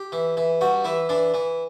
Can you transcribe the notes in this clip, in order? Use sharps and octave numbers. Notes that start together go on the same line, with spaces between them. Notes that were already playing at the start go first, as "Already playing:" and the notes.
Already playing: G4
E3
E3
G2 F#4
E3 E4
E3 D4
E3